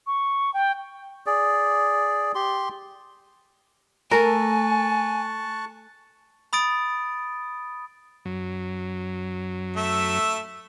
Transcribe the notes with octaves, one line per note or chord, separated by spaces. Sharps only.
C#6
G5
G#4 D5
G4 C6
A3 A#4 G#5 A5 C#6 F#6
B5 D#6 A6 D7
F#2 F#3
A3 E5